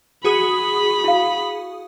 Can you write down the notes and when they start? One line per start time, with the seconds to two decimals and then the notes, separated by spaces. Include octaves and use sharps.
0.25 F#4 G#4 B5 D#6
1.04 E4 F5